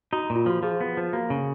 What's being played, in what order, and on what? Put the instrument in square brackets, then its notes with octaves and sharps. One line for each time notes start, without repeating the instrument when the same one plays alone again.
[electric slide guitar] D#4 [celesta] F#4
[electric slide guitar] A#2
[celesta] F4
[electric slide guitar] F3 [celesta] F#4
[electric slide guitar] F3 [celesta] G#4
[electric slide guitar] B3
F3
[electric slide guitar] A#3 [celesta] F#4
[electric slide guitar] C#3